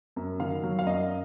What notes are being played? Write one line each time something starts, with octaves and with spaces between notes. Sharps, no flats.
F#2
D#3 F5
F#3
F5
F#2 D#5